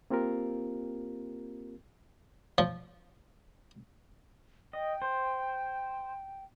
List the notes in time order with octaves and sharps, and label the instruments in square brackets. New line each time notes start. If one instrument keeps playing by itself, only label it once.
[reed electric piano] A#3 C4 F4 G4 A#4
[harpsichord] F3
[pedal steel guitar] D#5 [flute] G5
[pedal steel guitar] C5